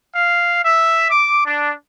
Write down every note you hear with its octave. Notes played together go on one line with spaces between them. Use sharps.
F5
E5
D6
D4